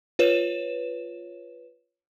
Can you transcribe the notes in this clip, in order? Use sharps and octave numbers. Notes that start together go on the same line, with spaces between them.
F4 B4 C#5 E7